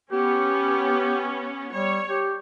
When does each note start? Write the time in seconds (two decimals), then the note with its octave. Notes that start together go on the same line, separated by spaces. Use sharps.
0.12 B3 C#4 G4
1.72 G3 C#5
2.09 G4